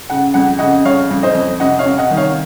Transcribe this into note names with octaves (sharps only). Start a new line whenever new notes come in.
C#3 F#5
F2 F#5
C#3 D#5 F#5
F2 C#5 F5
F2
C5 D#5
F2
C3 D#5 F#5
C#5 F5
C3
D#5 F#5
D#3
C#5 F5